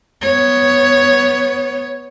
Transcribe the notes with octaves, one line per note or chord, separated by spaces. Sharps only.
B3 C#5